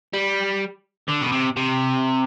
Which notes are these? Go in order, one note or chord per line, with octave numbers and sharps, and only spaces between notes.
G3
D3
B2
C3
C3